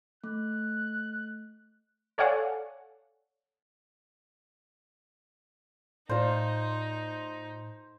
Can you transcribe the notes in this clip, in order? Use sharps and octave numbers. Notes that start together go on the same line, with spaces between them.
A3 F#6
A4 C#5 D5 F5 F#5 G#5
A2 D#4 F4 C5 D5